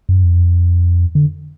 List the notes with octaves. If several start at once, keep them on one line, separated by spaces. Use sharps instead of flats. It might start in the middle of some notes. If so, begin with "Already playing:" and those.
F#2
F2
D3